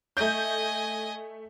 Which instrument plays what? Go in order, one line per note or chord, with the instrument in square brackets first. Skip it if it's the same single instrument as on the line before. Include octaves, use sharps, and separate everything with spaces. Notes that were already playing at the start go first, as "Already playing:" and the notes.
[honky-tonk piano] A3 G6 [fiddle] D#5 G#5